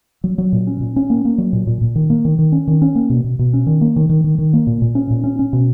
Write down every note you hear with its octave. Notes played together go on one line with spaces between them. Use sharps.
F#3
F#3
A#2
C#4
A#2
C#4
A#3
A#3
F#3
A#2
A#2
A#2
D#3
A#3
D#3
D#3
C#4
D#3
C#4
A#3
B2
B2
B2
C#4
D#3
A#3
D#3
D#3
D#3
D#3
A#3
A#2
A#2
C#4
A#2
C#4
C#4
B2